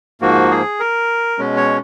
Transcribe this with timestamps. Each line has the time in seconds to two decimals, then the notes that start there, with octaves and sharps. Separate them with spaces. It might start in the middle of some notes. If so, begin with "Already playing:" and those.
0.21 G#2 F3 A#3 F#4
0.51 G#4
0.80 A#4
1.38 B2 G#3 C#4
1.57 C#5